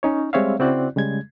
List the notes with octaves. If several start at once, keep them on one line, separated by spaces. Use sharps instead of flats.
C#4 D#4 C#5
G3 G#3 C4 C#5 E5 F5
C#3 C4 E4 F#4 D5 F#6
C#3 G3 G#3 G#6